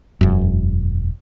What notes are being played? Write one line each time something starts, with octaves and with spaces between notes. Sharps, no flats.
E1 F#2